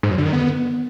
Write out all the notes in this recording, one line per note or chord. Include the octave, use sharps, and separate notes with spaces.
G#2
F#2
D3
D#3
B3